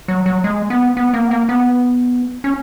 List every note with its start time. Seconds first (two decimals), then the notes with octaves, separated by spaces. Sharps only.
0.08 F#3
0.26 F#3
0.44 G#3
0.70 B3
0.97 B3
1.14 A#3
1.27 B3
1.31 A#3
1.49 B3
2.44 C#4